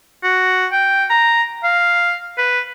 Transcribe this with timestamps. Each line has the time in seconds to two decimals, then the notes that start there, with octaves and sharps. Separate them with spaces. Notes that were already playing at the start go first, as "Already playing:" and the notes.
0.23 F#4
0.72 G5
1.10 A#5
1.64 F5
2.38 B4